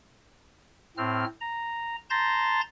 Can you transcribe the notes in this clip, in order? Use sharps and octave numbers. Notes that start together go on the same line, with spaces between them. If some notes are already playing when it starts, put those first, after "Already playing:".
A2 C4 F6
A#5
A5 A#5 C6 G6 A6 A#6